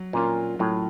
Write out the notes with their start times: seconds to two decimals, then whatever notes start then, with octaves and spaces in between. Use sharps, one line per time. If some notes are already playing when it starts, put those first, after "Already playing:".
Already playing: F#3
0.13 A#2 A#3 C#4 F4
0.59 A2 F#3